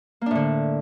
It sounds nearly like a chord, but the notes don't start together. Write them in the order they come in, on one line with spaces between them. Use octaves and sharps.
A#3 D4 A2 D3